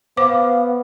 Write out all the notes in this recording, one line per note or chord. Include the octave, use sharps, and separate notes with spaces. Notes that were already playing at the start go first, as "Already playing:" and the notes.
B3 C5 F5 D6